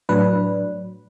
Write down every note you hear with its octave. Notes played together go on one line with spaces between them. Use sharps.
A2 F#3 D4 B4